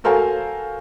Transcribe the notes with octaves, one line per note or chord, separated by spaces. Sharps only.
F#4 A4 A#4 C5 F5 G#5